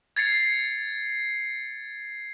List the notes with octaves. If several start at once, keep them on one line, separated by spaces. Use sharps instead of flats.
G#6 A6 C7 C#7